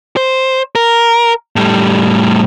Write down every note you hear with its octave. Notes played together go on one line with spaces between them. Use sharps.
C5
A#4
A2 G3